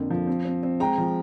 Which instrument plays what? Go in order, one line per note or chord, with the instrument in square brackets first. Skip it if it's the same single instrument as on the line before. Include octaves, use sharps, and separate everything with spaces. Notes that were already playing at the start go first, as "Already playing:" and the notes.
Already playing: [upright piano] F2 D3 A#3
F3
C4
C4
C4
G#3 G5 A#5
F3